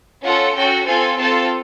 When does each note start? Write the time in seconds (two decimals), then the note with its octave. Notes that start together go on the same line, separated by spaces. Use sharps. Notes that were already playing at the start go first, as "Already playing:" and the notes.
0.24 C#4 F4 A4 F#5
0.55 C#4 F#4 A4 G5
0.86 C4 F4 A4 G#5
1.18 C4 F4 A4 A5